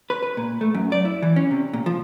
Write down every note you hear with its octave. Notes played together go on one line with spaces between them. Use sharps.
B4
B4
A#2
A3
F#2
D5
E4
E3
C#4
C3
A#2
F3